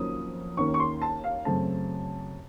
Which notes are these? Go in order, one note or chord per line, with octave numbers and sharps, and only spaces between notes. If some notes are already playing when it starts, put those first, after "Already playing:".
Already playing: F2 D#3 F#3 A#3 C#4 D#6
D#2 D#3 A#3 C#4 C#6
C#6
C6
A5
F5
F#2 C#3 A3 C4 A5